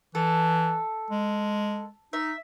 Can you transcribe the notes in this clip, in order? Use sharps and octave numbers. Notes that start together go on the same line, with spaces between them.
E3 A4
G#3
D#4 E5